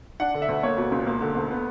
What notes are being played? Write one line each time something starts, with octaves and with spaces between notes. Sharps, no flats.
D4 F#5
D3
E5
D2
A#3 C#5
B2
C#2
A#3
D3
D2
B3